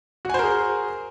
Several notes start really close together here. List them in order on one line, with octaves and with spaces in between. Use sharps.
F#4 G#5 C5 A#4 G#4